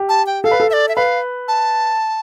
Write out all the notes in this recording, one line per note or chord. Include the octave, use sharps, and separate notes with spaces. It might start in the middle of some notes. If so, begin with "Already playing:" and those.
Already playing: G4
A5
G5
A4 F5
B4
A4
E5
D5
E5
B4 F5
A5